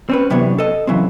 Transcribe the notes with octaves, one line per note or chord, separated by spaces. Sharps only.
C4 C#4 B4
F#2 C3 E3 B3 D4 C#5
A4 D#5
C#3 E3 F#3 C4